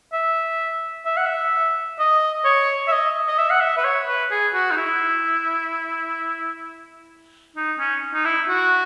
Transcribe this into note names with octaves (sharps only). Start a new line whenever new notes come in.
E5
E5
F#5
E5
D#5
C#5
E5
D#5
D#5
E5
F#5
E5
B4
C#5
B4
G#4
F#4
D#4
E4
D#4
C#4
D#4
E4
F#4